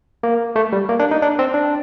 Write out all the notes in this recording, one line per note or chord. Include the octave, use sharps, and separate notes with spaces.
A#3
A3
G3
A#3
D4
D#4
D4
C4
D4